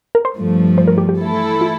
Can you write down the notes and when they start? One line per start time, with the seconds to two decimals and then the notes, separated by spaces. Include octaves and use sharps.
0.15 A#4
0.25 C5
0.36 G2 F3 A3
0.78 C5
0.88 A#4
0.98 G4
1.09 G4
1.19 E3 A3 E4 A4
1.61 F4